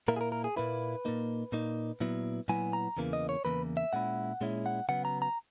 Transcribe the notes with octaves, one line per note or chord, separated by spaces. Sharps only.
A#2 A#3 E4 A#4
G#4
A#4
A#4
G#4
A#2 A#3 E4 B4
A#2 A#3 D#4
A#2 A#3 D#4
A#2 F#3 B3 E4
A#2 F#3 B3 E4 G#5
A#5
E2 C#3 E3 A#3
D#5
C#5
E2 C#3 E3 A#3 B4
E5
A#2 G#3 C#4 E4 F#5
A#2 G#3 C#4 E4
F#5
C#3 F#3 B3 F#5
A#5
A#5